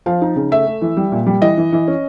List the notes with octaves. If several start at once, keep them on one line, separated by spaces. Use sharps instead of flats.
F3 F5
D#4
C#3
A3 E5
A3
E3
G3
A#2
G3
E3 D#5
E3
E3
C#4